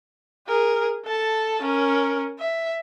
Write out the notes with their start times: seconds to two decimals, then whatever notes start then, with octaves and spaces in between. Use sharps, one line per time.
0.48 G#4 A#4
1.06 A4 A5
1.62 C#4 A#4
2.39 E5